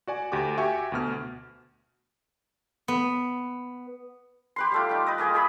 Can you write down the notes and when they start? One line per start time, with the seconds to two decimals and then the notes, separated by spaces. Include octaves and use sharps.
0.07 F#4 D5 G#5
0.32 D2 F#4 G4 D6
0.58 F#4 G4 E5 G#5 C#6
0.92 D2 B2 F6
2.88 B3
4.56 G4 B4 C6
4.72 G3 A3 F4
4.89 D#4 G5
5.06 B4 D#5
5.18 A#3 G4 G#4 D#5
5.34 G#4 C#5 E5 B5